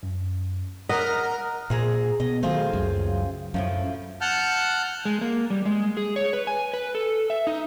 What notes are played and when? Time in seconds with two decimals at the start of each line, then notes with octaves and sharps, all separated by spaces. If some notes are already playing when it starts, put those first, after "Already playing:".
0.03 F#2
0.89 A#4 D#5 F#5 F6 B6
1.70 A#2 C4 G#4 A#5
2.20 B2 D#5
2.43 D#3 F#3 A3 C4 F4 G#4
2.73 C#2 F#2
3.54 F#2 A2 D3 F3
4.21 F#5 A5 F6 G6
5.05 G#3
5.21 A#3
5.50 G3
5.65 G#3
5.97 G#4
6.16 C#5
6.33 B4
6.47 G#5
6.74 B4
6.95 A4
7.30 E5
7.47 D#4